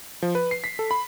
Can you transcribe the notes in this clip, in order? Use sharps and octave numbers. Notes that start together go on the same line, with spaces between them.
F3
B4
C7
B6
A4
B5